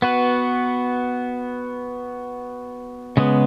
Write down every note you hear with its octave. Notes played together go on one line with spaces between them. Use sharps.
B3 F#4 B4
C#3 G#3 B3